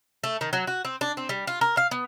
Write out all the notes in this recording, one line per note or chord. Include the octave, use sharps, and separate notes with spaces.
A3
D#3
F#3
F#4
C4
D4
C4
G3
F4
A#4
F5
B3